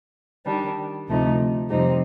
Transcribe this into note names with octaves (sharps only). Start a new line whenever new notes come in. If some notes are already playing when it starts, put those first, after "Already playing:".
D#3 G3 D4
D2 C3 F3 A3 D#4
F2 C3 G3 C4 D#4